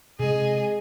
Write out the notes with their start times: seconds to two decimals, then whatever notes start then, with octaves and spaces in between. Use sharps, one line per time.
0.19 C3 G#3 G#4 D#5